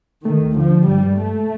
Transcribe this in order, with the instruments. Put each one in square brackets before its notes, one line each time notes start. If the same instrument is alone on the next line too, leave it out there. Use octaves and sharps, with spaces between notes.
[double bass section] D#3 [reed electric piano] A3
[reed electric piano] D#2
[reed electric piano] D3 [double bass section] F3
[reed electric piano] D3
[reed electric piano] G2 [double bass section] G3
[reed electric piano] G2
[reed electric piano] G2 [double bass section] A3